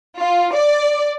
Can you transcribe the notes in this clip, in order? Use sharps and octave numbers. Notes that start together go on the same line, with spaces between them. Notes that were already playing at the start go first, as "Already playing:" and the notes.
F4
D5